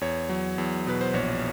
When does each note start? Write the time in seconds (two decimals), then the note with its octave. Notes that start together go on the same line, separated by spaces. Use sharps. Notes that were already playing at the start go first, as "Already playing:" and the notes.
0.01 E2 C#5
0.29 F#3
0.58 E2
0.87 B2 B4
1.01 C5
1.14 A#1 C#5